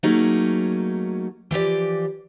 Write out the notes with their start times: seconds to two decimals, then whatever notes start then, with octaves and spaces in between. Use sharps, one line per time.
0.03 F#3 A3 A#3 C#4 D#4 G#4
1.51 E3 F3 G4 D5